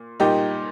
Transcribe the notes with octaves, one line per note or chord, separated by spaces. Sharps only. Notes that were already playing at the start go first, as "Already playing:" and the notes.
Already playing: A#2
A#2 G3 D#4 G4